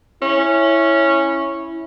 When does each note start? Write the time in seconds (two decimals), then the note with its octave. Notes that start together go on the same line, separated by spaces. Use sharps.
0.22 C#4 E4